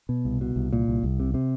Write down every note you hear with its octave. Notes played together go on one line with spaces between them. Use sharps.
B2
C2
B2
C2
A#2
C2
C2
C3
C3